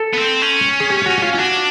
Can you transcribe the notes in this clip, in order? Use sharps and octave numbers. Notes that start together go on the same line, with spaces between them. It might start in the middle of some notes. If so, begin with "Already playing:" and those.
Already playing: A4
B3
C4
C#4
G#4
G4
F#4
F4
C#4
D4 F#4